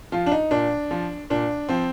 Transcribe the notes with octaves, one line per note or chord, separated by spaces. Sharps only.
F3 F4
D4
D#4
A#2 D4
F3
A#2 D4
F3 C4